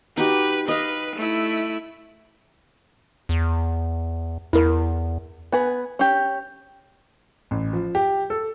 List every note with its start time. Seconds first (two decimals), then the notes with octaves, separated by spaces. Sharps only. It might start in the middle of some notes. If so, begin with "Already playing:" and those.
0.17 D#4 F#4 G4 B4
0.68 B4 D#5 F5
1.16 A3 E4
3.29 E2
4.53 E2 E4 A#4
5.52 B3 G#4 B4
5.99 C#4 G4
7.51 A1
7.73 F3
7.95 G4
8.30 A4